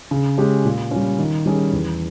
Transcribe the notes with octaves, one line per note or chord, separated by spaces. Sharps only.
C#3
G#3 C#4 G4
A#2
G3 C#4
D#3
G3 C#4 G#4
E2